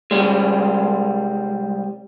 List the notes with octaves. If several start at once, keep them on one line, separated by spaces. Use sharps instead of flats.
C2 F#2 G3 G#3